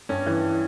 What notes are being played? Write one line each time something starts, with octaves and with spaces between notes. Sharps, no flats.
G2 C#4
E3